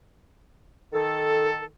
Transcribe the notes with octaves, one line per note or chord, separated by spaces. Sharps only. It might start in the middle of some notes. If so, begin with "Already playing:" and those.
D#3 A4